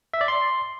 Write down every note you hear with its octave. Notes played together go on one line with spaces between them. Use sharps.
E5
D5
C6